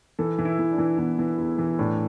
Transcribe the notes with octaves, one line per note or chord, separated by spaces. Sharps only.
E3 A4
E3
E4
E3
D4
E3
E3 B3
E3
E2
E3
A2 D4